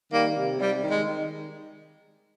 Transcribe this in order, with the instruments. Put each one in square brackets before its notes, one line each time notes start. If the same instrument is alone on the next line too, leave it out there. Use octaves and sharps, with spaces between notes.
[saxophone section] D#3 G3 A#3
C3
C3 G3
D#3
G#3
D#3